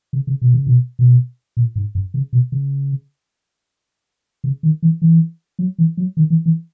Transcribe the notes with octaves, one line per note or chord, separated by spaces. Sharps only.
C#3
C#3
B2
C#3
B2
B2
A#2
G#2
F#2
C#3
B2
C#3
C#3
D#3
E3
E3
F#3
E3
F#3
D#3
E3
E3